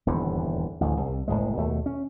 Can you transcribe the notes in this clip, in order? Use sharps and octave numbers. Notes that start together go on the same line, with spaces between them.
D#1 E2 G2 D3
A1 D2
C2
F#1 E2 A2 G#3
D#2 B2 A3
C#4